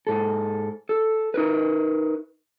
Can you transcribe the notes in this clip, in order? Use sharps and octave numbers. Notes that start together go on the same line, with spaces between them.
G#2 A4
A4
D#4 A#4 B4